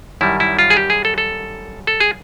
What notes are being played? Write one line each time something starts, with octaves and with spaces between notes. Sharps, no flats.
F#2 D#3 G3 E4
E4
F4
G#4
G4
G#4
A4
A4
A4
G#4